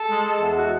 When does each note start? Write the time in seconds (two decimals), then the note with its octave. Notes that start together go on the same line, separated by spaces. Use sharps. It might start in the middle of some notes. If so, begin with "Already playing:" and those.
Already playing: A4
0.09 G#3
0.25 G#3
0.40 E2
0.57 F#4